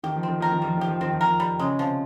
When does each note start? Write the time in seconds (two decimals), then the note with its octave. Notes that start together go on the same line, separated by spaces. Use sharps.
0.03 D#3 G4
0.16 F3
0.23 C4
0.28 D#3
0.40 F3 A#4
0.52 D#3
0.62 F3 G3
0.77 D#3 G4
0.88 F3
1.01 D#3 C4
1.14 F3
1.21 D#3 A#4
1.40 G3
1.59 C#3 G#3
1.79 C3 F3